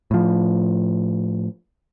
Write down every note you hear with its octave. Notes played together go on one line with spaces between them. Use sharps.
A2 F3